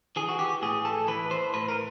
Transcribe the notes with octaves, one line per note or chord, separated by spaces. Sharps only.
E3 G#4
F#4
G4
A2 G#4
A4
E3 B4
C5
A2 B4
A#4